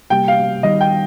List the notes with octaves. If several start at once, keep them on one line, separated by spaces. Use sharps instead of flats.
C3 G3 A#3 G4 G5
F5
D#3 G3 D#4 D#5
G5